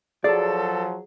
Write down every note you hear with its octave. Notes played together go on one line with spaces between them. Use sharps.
F3 F#3 G#4 A4 D5